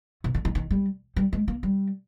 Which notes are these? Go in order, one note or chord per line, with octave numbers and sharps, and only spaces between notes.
C3
D3
D#3
D#3
G3
G3
G#3
A#3
G3